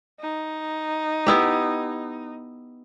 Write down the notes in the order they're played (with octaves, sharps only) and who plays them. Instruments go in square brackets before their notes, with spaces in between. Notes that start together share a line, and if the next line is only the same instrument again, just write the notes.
[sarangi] D#4
[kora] B3 E4 G4